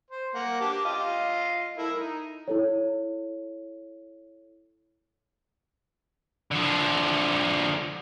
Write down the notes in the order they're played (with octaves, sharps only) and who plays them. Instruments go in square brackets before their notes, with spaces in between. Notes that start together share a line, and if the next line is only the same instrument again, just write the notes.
[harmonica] C5
A#3 F#5
G4 A5 D6
F4 D#5 F5
E4 A4 A#4
D#4
[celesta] E4 A4 C#5
[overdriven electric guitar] D3 F3